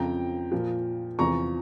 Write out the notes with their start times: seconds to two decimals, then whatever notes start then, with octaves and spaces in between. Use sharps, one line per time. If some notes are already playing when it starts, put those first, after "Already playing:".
Already playing: F2 C#3 F3 G5 A#5
0.52 A#2 F3
1.19 E2 C3 F3 A#5 C#6